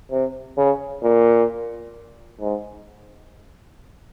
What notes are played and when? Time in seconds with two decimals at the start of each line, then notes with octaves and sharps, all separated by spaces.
0.11 C3
0.57 C#3
1.03 A#2
2.40 G#2